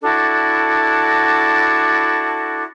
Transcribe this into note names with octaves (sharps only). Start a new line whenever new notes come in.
D4 E4 F#4 A4